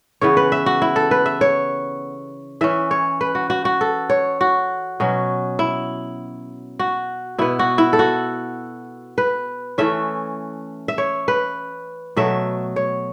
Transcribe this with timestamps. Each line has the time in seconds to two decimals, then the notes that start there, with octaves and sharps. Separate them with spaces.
0.21 C#3 E3 B3 C#5
0.37 B4
0.52 E5
0.66 F#4
0.82 E4
0.96 A4
1.11 B4
1.26 E5
1.41 C#5
2.61 E3 C#4 E5
2.91 C#5
3.21 B4
3.35 F#4
3.50 F#4
3.65 F#4
3.81 A4
4.10 C#5
4.41 F#4
5.00 B2 F#3 C#4
5.59 E4
6.79 F#4
7.38 B2 B3 E4
7.59 F#4
7.78 E4
7.93 A4
7.99 F#4
9.18 B4
9.78 E3 A3 C#4 E5
10.88 E5
10.98 C#5
11.28 B4
12.16 B2 F#3 A3 E5
12.76 C#5